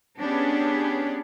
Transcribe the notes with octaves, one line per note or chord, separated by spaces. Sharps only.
B3 C#4 D4 G4 G#4 B4